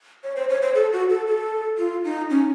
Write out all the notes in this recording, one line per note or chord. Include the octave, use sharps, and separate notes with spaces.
C#5
C5
C#5
C5
A4
F#4
A4
A4
F4
D#4
C#4